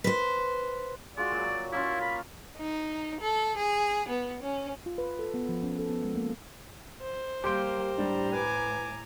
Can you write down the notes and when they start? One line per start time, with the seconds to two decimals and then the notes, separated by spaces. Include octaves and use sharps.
0.04 B4 C5
1.17 G#3 F4 F#4 D5
1.32 A#2 F#3
1.72 A#3 C#4 E4 F4
2.01 A#4 B5
2.58 D#4
3.21 A4
3.58 G#4
4.10 B3
4.42 C#4
4.86 F4
4.98 B4
5.19 A4
5.34 B3
5.49 F3
5.63 C#4
5.79 A4
5.90 B3
6.04 G#3
6.16 A#3
7.01 C5
7.44 G3 A#3 G4 A#4 G5 C6 G6
7.98 A2 G3 D4 A#5
8.33 B4 G#5 D6